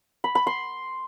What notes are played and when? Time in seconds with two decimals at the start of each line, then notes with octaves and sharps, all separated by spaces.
0.24 B5
0.35 B5
0.47 C6